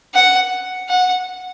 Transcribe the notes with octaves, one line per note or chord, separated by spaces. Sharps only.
F#5
F#5